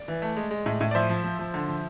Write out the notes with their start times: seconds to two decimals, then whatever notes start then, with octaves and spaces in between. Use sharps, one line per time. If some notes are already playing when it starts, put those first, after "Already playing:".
Already playing: D5
0.08 E3
0.22 A3
0.37 G#3
0.51 G#3
0.66 A2
0.81 A2
0.91 D5
0.95 F3 C5 E5
1.09 F3
1.24 F3
1.39 F3
1.54 D3
1.68 F3